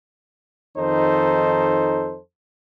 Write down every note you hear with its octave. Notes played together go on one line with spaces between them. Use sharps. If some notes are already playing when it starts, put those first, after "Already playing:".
F2 D#3 D#4 A4 C5